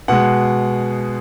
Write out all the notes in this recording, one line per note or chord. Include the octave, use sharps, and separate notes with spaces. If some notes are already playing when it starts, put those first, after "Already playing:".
B2 G#3 F#5